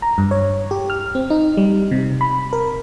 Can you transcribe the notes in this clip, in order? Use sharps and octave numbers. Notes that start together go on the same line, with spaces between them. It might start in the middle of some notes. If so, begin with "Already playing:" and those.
A#5
G2
C#5
G4
F6
C4
D#4
G3
C3
B5
A#4